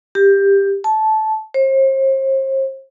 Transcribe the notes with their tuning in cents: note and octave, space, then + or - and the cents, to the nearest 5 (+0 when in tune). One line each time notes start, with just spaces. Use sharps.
G4 +15
A5 -15
C5 +40